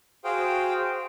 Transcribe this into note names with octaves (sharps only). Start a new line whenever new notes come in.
F#4 G#4 C5 F5 G5